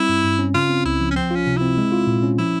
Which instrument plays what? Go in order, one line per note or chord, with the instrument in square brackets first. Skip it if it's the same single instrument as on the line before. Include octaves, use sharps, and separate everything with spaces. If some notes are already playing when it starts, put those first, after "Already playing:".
Already playing: [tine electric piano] G3 C4 [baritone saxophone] E4
[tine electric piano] G2
G2
C#4
[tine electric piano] C#3 [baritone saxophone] F4
[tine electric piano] C4
[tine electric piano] C#2 [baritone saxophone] E4
[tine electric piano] F3
[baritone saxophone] C#4
[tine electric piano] F3 [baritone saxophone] C4
[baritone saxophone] C#4 [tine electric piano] F4
[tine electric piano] C3
[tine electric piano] C4 [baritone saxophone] E4
[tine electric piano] G#3
F4
A#2
C#4
[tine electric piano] F3 [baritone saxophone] E4